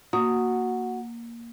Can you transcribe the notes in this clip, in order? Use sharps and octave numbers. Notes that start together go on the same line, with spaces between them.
A#3 F#4 D#6